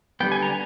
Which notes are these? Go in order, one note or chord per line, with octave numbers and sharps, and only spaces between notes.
D3 G3 B3 G5
G#5
A#5